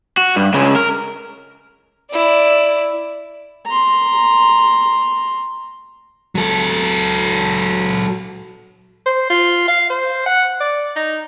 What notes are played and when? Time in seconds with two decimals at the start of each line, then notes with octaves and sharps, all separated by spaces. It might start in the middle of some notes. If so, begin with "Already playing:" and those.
0.17 F#4
0.36 G2
0.54 C#2 C#3
0.76 A#4
2.11 E4 D5
3.66 A#5 C6
6.35 F#3 A4
9.06 C5
9.30 F4
9.68 F5
9.90 C5
10.26 F#5
10.60 D5
10.96 D#4